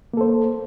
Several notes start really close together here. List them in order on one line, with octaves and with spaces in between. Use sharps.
A#3 A4 C5